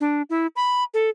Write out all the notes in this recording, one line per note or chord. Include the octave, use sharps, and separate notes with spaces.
D4
E4
B5
A4